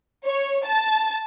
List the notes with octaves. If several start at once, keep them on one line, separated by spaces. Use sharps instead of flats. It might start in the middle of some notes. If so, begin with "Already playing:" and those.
C#5
A5